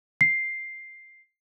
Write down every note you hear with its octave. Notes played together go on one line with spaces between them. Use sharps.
C7